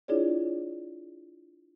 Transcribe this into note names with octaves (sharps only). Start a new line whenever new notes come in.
D4 E4 F4 G#4 C#5 D5